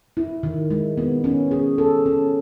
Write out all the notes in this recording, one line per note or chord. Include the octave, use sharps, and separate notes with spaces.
E4
D#3
G#3
B3
C#4
G#4
A4
C#4